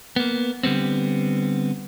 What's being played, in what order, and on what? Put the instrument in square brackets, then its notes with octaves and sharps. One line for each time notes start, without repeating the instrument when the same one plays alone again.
[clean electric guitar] A#3 B3
D3 G3 B3 C4